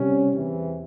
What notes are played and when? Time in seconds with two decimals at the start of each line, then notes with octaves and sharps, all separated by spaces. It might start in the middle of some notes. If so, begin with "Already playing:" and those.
Already playing: C3 G3 C#4
0.31 E2 C3 E3